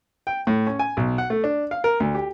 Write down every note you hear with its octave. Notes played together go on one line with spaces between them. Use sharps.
G5
A2
C#4
G#5
B1
F#5
A3
D4
F5
A#4
D2
G4